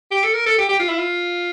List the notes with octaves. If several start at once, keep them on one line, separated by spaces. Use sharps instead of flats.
G4
A4
A#4
A4
G4
G4
F4
E4
F4